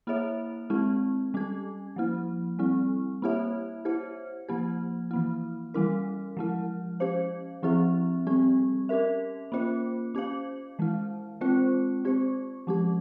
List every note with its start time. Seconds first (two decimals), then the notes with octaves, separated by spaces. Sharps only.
0.07 A#3 E4 G#4 C#5 E5
0.70 G#3 C4 E4 G4
1.34 G3 C#4 G4
1.96 F3 A#3 E4
2.59 G3 C4 E4
3.22 A#3 E4 G4 C#5 E5
3.85 E4 G4 C5
4.48 F3 A#3 E4 G4
5.11 E3 A#3 E4
5.74 E3 G3 C#4 E4 A#4
6.37 F3 G#3 E4
7.00 C#4 G4 C5 F5
7.63 F3 C4 E4 G#4 E5
8.27 G3 C4 G4
8.89 C#4 G4 A#4 E5
9.52 A#3 C#4 F4 C5
10.15 C#4 G4 C5 F5
10.79 E3 G#3 E4
11.41 G#3 C4 F4 C5
12.05 C4 G4 C5
12.67 F3 G#3 C#4 G4